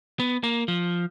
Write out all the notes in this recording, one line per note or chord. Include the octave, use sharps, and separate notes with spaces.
B3
A#3
F3